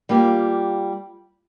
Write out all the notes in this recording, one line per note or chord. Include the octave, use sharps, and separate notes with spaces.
G3 A#3 F4 G4